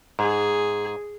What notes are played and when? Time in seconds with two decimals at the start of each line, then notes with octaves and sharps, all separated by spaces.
0.19 G#2 G#4